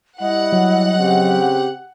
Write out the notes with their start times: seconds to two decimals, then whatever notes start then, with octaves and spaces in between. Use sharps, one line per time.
0.21 G3 E4 D#5 F#5
0.52 F#3
0.99 C#3 C4 G4